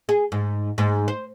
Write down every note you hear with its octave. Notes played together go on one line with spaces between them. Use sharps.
G#4
G#2
G#2
C5